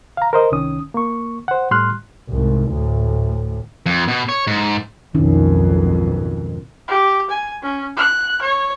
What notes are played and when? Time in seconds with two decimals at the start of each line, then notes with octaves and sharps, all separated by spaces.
0.17 F5 A#5
0.33 A#4 C5 D#5
0.52 C2 D#3 C#4 D#6
0.94 A#3 C#6
1.48 C5 F#5
1.71 A2 G3 C6 F6 F#6
2.30 C2 G#2
2.72 D2 A2
3.86 F2
4.08 B2
4.29 C#5
4.47 G#2
5.15 B1 F2 G#2 D#3 C#4 E4
6.88 G4
7.30 G#5
7.62 C#4
7.97 F#6
8.42 C#5